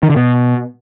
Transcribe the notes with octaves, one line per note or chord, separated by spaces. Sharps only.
D#3
D3
B2